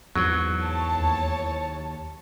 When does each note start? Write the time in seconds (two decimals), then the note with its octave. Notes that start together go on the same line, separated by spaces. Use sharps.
0.16 E2 G#2 F#3
0.64 C#5 A5
0.97 D#2